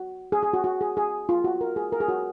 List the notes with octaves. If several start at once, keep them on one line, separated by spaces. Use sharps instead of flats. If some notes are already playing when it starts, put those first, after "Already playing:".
Already playing: F#4
G#4
G#4
F#4
F#4
G#4
G#4
F4
F#4
A#4
G#4
A#4
G#4
F#4